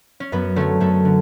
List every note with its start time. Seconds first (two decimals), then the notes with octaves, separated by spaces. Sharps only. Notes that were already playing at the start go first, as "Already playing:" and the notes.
0.20 C#4
0.32 F#2 B3
0.56 D3 F#3 A3 C#4
0.80 F#2 A3
1.05 D3